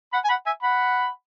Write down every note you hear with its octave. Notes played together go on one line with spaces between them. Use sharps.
F#5 B5
G#5
F#5 B5
E5 G#5
F#5 B5